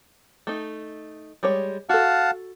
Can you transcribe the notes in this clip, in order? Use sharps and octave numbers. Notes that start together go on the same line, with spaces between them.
A3 D#4
G3 G#3 C#5
F#4 A4 F5 F#5 A5